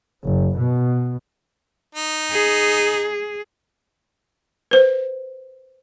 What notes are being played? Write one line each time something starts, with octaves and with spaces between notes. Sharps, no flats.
F#1
B2
D#4
G#4
B4 C5